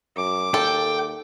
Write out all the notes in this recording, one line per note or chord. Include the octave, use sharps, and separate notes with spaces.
F#2 D6
D#2 A4 G5